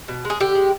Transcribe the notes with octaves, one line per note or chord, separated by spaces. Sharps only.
B2
G#3
G#4
D3 G4
G#3